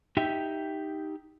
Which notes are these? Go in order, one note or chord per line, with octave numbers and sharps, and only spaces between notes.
D#4 G4 E5 G5